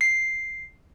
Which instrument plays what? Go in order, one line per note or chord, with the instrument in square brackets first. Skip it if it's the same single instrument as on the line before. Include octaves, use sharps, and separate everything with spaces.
[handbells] C7